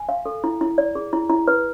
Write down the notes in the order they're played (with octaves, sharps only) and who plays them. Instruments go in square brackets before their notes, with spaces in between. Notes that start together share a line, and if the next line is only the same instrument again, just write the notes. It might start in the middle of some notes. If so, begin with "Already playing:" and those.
Already playing: [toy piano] G#5
F5
A4
E4
E4
D5
G#4
E4
E4
B4